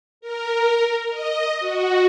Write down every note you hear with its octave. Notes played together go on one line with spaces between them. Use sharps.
A#4
D#5
F#4